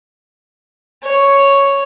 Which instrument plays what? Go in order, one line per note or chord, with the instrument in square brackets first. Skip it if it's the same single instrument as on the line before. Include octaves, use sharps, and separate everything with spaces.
[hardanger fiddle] C#5